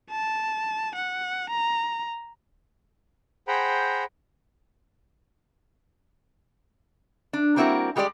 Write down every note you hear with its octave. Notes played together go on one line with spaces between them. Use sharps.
A5
F#5
A#5
G#4 C5 F#5 G5 A#5 B5
D4
G3 A#3 C4 E4 F#4 A#4
G3 G#3 G4 C#5 D5